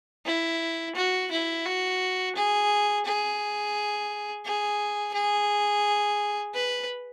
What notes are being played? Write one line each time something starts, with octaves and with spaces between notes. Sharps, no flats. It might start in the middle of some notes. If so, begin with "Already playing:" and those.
E4
F#4
E4
F#4
G#4
G#4
G#4
G#4
B4